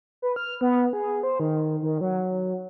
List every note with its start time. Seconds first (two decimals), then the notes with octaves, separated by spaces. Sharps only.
0.22 B4
0.36 F6
0.61 B3
0.93 G#4
1.23 C5
1.40 D#3
1.82 D#3
2.01 F#3